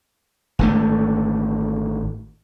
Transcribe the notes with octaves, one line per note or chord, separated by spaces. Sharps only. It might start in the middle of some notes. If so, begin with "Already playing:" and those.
G#1 D3 A3